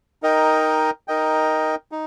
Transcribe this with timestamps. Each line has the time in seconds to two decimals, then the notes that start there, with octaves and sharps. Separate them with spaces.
0.23 D#4 A#4 D#5 G5
1.08 D#4 A#4 D#5 G5
1.92 D#4